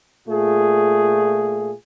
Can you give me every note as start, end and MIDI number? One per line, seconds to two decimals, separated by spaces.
0.29 1.73 46
0.29 1.73 57
0.29 1.73 65
0.29 1.73 68